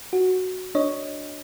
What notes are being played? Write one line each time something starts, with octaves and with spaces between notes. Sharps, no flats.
F#4
D4 C#5 D#5